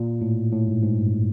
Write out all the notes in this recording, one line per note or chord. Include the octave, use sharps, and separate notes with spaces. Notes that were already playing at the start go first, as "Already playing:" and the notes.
Already playing: A#2
A2
A2
G#2
G#2
G2